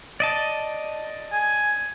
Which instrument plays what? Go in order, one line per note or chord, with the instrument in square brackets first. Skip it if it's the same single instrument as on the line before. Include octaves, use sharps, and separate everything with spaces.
[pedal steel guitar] D5 D#5 A5
[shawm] G#5